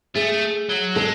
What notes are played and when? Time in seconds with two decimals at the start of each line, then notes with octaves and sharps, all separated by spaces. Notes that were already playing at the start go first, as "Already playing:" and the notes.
0.15 A3 G#4
0.69 F#3
0.95 G#3 A4